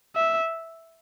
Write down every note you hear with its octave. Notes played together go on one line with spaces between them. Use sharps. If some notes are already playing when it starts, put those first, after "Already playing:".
E5